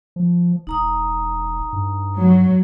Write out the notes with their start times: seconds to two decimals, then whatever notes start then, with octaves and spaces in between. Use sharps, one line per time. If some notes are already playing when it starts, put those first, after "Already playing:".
0.16 F3
0.67 E1 D#4 A#5 D#6
1.73 G2
2.17 F#3